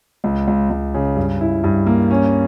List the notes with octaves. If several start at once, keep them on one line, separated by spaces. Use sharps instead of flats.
C#2
C#2
C#2
C#3
G2
E4
G2
A#3
C#4